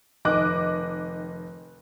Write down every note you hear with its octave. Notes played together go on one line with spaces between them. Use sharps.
F1 D#3 D#5 D6 F#6